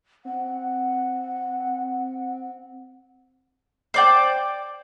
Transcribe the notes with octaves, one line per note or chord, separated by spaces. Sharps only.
C4 F#5
C5 D5 G5